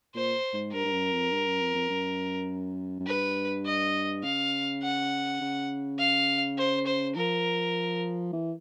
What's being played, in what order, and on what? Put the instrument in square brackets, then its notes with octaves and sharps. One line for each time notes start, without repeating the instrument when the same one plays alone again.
[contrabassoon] A#2 [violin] C5
[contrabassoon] G#2
[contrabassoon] G2 [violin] A#4
[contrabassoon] G2
F#2
F2
G2
F#2
F2
F2
F#2
F#2
[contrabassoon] G2 [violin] B4
[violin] D#5
[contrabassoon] C#3 [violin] F5
[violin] F#5
[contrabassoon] C#3
[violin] F5
C5
C5
[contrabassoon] F3 [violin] A#4
[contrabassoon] E3